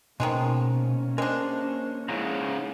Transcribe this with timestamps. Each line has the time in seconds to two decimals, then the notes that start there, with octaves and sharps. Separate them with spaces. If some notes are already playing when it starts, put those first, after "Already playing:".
0.20 B2 D#3 F3 G#3 A#3 C#4
1.18 G#3 D4 A#4 C5
2.09 G#2 C#3 E4 A#5